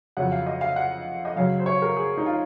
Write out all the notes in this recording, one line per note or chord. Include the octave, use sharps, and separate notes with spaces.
F2 C#3 F#3 F#5
F5
D#5
F5
F#5
D#5
F#2 C#3 F#3 F5
C5
C#5
A#4
G#4
D#4
F4